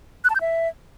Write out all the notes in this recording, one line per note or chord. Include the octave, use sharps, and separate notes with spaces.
F#6
A5
G6
E5